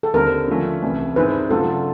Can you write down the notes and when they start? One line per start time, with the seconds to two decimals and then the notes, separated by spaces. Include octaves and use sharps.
0.03 A4
0.14 D#2 D3 G3 C4 A#4
0.48 D3 F3 A3 C#4
0.82 C2 C3 E3 A3 C#4
1.16 G2 D#3 G#3 C4 E4 B4
1.50 C#3 F#3 A3 D4 F4 A4